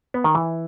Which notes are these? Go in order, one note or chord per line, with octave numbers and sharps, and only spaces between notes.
B3
D#3
E3